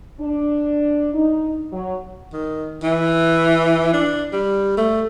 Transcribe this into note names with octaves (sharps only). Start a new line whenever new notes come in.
D4
D#4
F#3
D#3
E3
D4
G3
A3